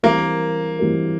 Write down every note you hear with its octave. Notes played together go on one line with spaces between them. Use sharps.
E3 G3 A#3 C4 G4 A#4
E3 G3 C4 G4 A#4